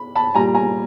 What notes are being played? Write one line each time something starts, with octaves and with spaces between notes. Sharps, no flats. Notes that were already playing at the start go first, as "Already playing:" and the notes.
Already playing: B5
A5 B5
A#2 G3 G#5 A#5
G#5 A#5